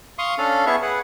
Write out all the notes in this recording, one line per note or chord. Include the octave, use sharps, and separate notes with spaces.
F5 C6 C#6 D#6
C#4 D4 A4 F5
B3 E4 G#4 E5 C#6
G#4 B4 F#5